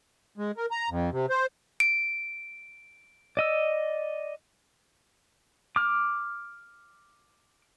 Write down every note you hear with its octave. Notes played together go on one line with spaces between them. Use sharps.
G#3
A#4
A#5
F2
C3
C5
D7
D5 D#5 E6
D6 F6